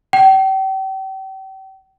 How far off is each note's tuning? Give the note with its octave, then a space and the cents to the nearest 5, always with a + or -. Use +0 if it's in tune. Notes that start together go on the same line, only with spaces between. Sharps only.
G5 -40